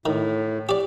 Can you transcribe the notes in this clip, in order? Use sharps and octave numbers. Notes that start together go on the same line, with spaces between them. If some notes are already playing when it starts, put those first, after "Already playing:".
A2 D#3
G4 D5